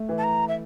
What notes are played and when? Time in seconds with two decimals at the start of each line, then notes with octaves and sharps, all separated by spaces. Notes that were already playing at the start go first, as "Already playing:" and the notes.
Already playing: A3
0.09 E3
0.18 A5
0.24 A#5
0.48 E5